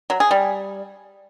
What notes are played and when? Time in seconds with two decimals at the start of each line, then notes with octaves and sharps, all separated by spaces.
0.10 F#3
0.20 G#4
0.31 G3